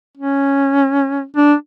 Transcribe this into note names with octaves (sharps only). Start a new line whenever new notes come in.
C#4
D4